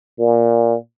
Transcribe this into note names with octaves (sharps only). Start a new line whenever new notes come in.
A#2